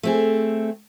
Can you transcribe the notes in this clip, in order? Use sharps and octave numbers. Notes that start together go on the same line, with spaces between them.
A3 C4 G#4